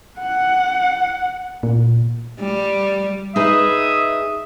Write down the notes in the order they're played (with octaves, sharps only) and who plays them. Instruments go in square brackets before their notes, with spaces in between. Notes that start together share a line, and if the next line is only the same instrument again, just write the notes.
[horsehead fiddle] F#5
[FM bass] A#2
[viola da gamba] G3
[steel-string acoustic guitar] D#4 G#4 B4 [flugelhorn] E5 [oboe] D#6